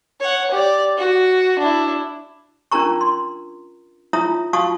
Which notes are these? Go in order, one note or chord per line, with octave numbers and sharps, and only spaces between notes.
C#5 F#5
G4 D5
F#4
D4 E4
C#4 D4 F4 A#4 A#5 C#6
C6
E4 F4 C#5 E5 A#5 D#6
F4 F#4 F5 A5 C#6 D#6